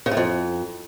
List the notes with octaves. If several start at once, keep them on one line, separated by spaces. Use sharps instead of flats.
C#3
A2
F2